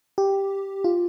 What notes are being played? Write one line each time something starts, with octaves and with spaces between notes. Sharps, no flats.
G4
F4